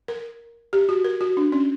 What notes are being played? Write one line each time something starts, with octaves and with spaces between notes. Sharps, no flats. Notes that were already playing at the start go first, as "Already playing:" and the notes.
A#4
G4
F#4
A#4
F#4
D4
C#4